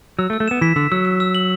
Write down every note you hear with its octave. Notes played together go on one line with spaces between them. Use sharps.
F#3 E6
A3
E6
A3
B3 E7
E3 B6
D3 E6
F#3 E6
E6
E6
F#7